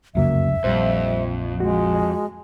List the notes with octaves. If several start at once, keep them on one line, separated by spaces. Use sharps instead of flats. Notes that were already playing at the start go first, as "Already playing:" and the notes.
F1 C#2 F#2 C#3 F#3 A#3 E5
A#1 F2 G3 C5
G#3 F#4